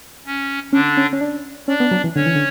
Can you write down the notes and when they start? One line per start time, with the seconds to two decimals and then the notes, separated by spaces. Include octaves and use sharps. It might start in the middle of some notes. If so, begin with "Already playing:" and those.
0.26 C#4
0.73 D3 C#4 D4
0.97 C#4
1.13 C#4
1.21 D4
1.68 C#4 D4 D5
1.80 B3
1.91 F#3
2.04 E3
2.15 D3 C#4 C#5
2.26 E3
2.35 D3